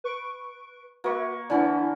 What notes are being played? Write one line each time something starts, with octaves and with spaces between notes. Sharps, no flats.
B4 C#6 D7
A#3 F#4 B4 E5 C#6
D3 E3 C#4 D4 E4 D5